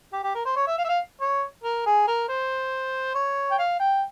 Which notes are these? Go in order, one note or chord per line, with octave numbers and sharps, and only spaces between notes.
G4
G4
A#4
C5
C#5
E5
F5
E5
F5
C#5
A#4
G#4
A#4
C5
C#5
G5
F5
G5